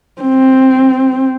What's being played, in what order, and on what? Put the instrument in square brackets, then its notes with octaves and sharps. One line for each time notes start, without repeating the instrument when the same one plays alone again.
[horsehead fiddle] C4